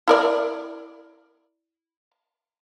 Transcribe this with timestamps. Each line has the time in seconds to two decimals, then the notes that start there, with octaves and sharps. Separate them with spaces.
0.08 E4 A#4 D5